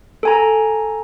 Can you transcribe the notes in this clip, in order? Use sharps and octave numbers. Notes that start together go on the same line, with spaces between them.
A4 G#5 A#5